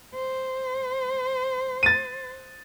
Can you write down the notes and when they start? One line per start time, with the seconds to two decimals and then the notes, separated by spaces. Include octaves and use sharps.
0.14 C5
1.83 A6 D#7